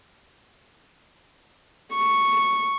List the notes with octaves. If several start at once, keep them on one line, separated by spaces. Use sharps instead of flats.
C#6